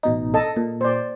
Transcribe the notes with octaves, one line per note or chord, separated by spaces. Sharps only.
A1 B2 D#4
A4 D#5 A5
A#2
C5 D5